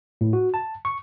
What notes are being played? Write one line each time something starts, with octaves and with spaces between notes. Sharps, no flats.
A2
F#4
A5
C#6